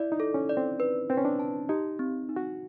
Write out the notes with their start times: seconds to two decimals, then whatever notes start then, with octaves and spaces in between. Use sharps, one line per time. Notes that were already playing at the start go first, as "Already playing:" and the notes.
Already playing: E4 D5
0.12 D#4
0.20 A4
0.34 C#4
0.49 D5
0.57 C4
0.80 B4
1.10 C4 B4
1.17 C#4
1.25 D4
1.39 A5
1.69 D#4 G4
1.99 C4
2.29 D#4
2.36 F#4